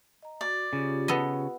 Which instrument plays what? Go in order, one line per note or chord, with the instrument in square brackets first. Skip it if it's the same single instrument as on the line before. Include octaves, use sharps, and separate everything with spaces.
[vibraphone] D#5 A#5
[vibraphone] F#4 [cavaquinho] D5
[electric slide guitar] C#3 [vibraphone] F4 G4
[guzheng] B3 A4 D#5